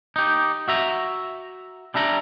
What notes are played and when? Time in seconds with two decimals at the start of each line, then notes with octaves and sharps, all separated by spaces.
0.16 D#4 G4
0.68 F#4 E5 A#5
1.94 G3 D4 E5 A#5